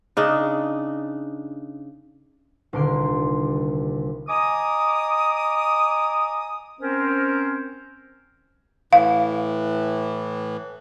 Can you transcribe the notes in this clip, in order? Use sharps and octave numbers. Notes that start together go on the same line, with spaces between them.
C#3 D4 D#4
D#1 C2 D3 A#4 C6 D7
D#5 G#5 A#5 D6 D#6
C4 C#4 A#4 C5
A2 E3 F5